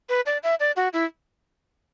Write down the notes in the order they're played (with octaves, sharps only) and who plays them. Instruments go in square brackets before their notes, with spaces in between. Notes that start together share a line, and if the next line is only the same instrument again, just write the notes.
[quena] B4
D5
E5
D5
F#4
E4